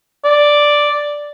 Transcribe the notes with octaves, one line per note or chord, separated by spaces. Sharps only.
D5